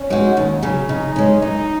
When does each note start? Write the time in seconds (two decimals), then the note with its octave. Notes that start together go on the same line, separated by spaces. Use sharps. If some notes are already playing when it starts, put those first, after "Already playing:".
Already playing: C#4
0.10 G#3 D#4 F#4
0.37 D#2
0.63 C#3 F#3
0.89 C#3 D#4
1.16 G#3 C#4
1.42 F#2 D#4